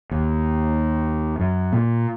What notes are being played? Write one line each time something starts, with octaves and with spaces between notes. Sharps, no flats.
D#2
F#2
A#2